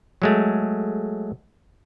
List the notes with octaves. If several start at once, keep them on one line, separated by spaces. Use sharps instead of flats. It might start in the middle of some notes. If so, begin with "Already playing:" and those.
F#3 G#3 A3